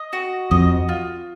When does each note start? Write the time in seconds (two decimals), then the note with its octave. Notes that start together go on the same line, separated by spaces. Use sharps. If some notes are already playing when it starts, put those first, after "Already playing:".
Already playing: D#5
0.13 F#4
0.51 F2 D#5
0.89 F4